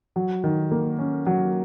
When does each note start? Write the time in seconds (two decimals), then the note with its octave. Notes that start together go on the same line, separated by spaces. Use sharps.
0.16 F#3
0.44 D#3
0.71 A#3
0.99 C#4
1.26 F#3